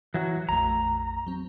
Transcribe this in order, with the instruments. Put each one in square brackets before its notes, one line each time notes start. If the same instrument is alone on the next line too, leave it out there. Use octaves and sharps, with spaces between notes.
[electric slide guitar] E3 F#3 F#4
[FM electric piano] A#1 F2 A3 [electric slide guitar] A#5
[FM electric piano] F#3 C4